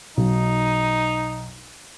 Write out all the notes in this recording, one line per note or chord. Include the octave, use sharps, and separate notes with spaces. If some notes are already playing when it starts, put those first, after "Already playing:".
B1 D#4